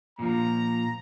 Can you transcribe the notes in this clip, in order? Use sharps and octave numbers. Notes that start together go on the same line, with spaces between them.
A#2 F3 A#5